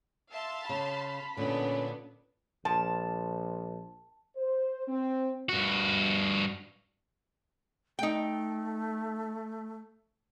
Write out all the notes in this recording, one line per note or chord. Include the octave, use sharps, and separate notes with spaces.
E5 F5 A5 C6
C#3 B5
A#2 D3 B3 C#4 D4 B4
A#1 F3 A5
C5
C4
G2 F#4
A3 D#4 G5